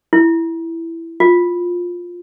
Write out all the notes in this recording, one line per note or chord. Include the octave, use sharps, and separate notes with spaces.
E4
F4